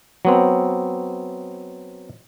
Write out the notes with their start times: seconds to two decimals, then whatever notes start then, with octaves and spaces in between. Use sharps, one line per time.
0.25 F#3 B3 C4